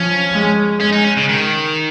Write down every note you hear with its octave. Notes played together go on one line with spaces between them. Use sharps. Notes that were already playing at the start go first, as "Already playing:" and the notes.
Already playing: F3 C#4
G#3
G#3 C#4
D#4
C#4
C#3
D#3